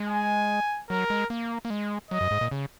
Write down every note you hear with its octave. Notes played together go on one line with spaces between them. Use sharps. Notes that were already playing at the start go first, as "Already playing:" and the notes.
Already playing: G#3
G#5
F#3 A#4
G#3
A#3
A#3
G#3
F#3 D#5
F#2
G#2
A#2
C#3